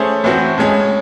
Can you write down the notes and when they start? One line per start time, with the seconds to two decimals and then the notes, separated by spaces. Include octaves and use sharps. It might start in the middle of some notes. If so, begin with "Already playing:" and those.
Already playing: A3 C#4 G#4 C5
0.24 A2 E3 C4 F#4
0.58 A2 G#3 C#4 G#4